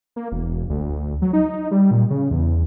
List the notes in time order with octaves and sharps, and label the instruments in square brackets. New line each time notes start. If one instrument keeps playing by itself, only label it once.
[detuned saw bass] A#3
E1
D2
F#3
D#4
G3
A#2
C#3
E2